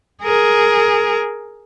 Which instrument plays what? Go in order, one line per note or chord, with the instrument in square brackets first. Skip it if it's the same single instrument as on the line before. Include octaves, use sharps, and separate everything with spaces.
[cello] G#4 A#4